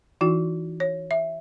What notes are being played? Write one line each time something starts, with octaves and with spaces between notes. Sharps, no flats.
E3 D#4 E4 F#4
C#5
E5